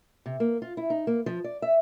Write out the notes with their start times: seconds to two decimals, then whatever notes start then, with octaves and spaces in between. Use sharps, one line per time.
0.26 C3
0.40 A#3
0.62 F4
0.77 E4
0.90 D#4
1.07 A#3
1.26 F3
1.44 D5
1.62 E5